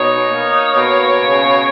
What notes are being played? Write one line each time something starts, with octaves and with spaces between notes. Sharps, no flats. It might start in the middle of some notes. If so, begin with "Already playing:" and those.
Already playing: B2 D#4 C#5
A#3
B2
C#3